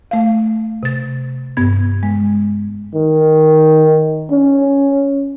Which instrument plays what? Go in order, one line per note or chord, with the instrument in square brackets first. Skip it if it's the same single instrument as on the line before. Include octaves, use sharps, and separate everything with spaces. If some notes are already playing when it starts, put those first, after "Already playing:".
[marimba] A3 F5
C3 A6
G2 B3 G#6
G#3
[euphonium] D#3
C#4